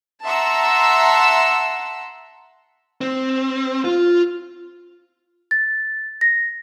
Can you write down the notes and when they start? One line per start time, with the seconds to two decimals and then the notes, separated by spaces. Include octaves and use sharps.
0.24 E5 F#5 A5 A#5 C6 E6
3.01 C4
3.84 F4
5.51 A6
6.21 A#6